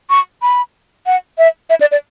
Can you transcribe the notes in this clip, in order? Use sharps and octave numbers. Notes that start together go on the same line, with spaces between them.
C#6
B5
F#5
E5
E5
D5
D5